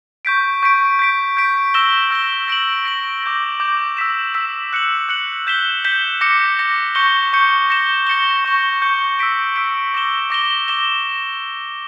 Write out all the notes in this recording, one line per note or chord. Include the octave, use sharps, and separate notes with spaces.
C#6 G6 B6 D7
C#6 G6 B6 D7
G6 B6 D7
G6 B6 D7
E6 A#6 E7 G7
E6 A#6 E7 G7
A#6 D7 F#7
A#6 D7 F#7
D6 G6 A#6
D6 G6 A#6
E6 B6 E7
E6 B6 E7
F#6 C#7 F#7
F#6 C#7 F#7
G6 B6 E7 G7
G6 B6 E7 G7
D6 A#6 C#7
D6 A#6 C#7
C#6 G6 C#7 G7
C#6 G6 C#7 G7
A#6 C#7 E7 G7
A#6 C#7 E7 G7
C#6 G6 C#7 G7
C#6 G6 C#7 G7
E6 B6 D7
E6 B6 D7
D6 A#6 E7 G7
D6 A#6 E7 G7
D6 A#6 E7 G7